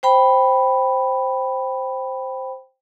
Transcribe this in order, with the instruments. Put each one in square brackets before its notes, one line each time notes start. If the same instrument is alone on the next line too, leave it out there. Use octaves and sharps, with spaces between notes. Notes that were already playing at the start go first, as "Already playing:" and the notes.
[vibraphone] C5 G5 B5